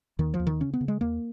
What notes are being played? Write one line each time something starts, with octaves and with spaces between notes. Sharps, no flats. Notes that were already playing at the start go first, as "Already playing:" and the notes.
D#2 D#3
F3
D#2
D#3
C#3 C#4
B3
C#3
G#3
D#2 A#3